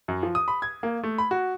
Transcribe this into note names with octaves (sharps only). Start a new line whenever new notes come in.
F#2
F3
D#6
B5
G#6
A#3
A3
B5
F#4